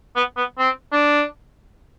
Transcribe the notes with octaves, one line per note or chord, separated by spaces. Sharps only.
B3
B3
C4
D4